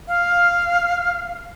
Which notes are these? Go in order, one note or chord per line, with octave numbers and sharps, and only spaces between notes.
F5